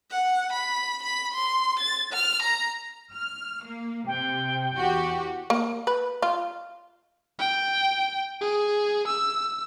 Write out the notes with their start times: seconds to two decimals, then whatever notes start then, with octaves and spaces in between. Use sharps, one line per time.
0.10 F#5
0.53 B5
1.03 B5
1.33 C6
1.79 A6
2.13 F6
2.42 A#5
3.12 F6
3.64 A#3
4.07 C3 G5
4.75 E2 F#4 G4
5.50 A#3
5.87 B4
6.22 F4
7.39 G5
8.41 G#4
9.07 E6